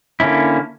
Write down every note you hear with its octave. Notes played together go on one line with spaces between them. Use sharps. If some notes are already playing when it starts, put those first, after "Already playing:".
D3 A#3 C#4 E4